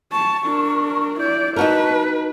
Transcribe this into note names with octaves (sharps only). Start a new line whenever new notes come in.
A5 C#6
D4 A#4
E4 D5 G6
D#4 F#4 A#4 B4 A5